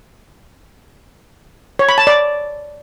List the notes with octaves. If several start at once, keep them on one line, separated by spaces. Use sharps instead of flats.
C#5
B5
A5
D5